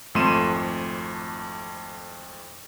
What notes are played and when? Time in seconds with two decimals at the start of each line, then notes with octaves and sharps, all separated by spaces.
0.15 G#1 F2 A3 C6 D#7 E7